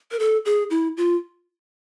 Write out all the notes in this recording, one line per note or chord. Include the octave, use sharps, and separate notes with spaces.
A#4
A4
G#4
E4
F4